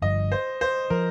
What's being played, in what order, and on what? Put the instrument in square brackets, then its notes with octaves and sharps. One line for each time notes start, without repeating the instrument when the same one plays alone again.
[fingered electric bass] G1 G2 F3 [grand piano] D#5
[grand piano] C5
C5
[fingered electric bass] F3 [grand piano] A#4